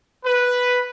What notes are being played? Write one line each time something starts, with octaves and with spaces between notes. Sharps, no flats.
B4